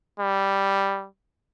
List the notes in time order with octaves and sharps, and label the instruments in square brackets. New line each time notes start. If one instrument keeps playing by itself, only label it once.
[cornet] G3